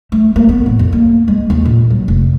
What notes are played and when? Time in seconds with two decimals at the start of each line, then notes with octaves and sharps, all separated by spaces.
0.12 A3
0.36 A#3
0.49 B3
0.66 A2
0.79 F2
0.93 A#3
1.28 G#3
1.50 D#2
1.66 A#2
1.90 F#3
2.08 F1